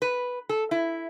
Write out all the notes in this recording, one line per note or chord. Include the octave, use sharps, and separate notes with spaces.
B4
A4
E4